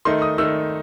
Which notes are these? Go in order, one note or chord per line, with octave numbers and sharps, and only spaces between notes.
D#3 A3 D#4 C6
D#6
D#3 A3 D#4 E6